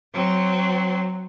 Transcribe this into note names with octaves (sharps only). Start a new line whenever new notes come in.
F#3 C4